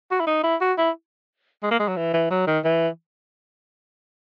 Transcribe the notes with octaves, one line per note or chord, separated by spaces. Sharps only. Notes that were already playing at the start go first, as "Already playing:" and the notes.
F#4
E4
D#4
E4
F#4
E4
G#3
A#3
G#3
F#3
E3
E3
F#3
D#3
E3